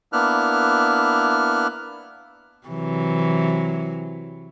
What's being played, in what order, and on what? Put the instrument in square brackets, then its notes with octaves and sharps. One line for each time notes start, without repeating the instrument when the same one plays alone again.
[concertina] A#3 B3 D4 E4 F6 F#6
[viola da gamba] C3 E3 F#3